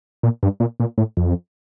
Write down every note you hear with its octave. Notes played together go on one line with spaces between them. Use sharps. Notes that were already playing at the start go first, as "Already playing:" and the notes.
A#2
G2
A#2
A#2
A2
F2